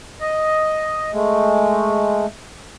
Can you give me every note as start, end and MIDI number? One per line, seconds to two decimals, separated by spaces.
0.20 1.11 75
1.12 2.26 56
1.12 2.26 57